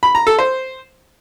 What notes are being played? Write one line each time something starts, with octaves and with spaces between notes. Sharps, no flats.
B5
A#5
A4
C5